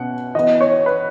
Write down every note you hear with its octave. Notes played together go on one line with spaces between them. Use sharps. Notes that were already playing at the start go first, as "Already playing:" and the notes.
Already playing: B2 C#4 F#5
E3 B3 D#5
C#5
B4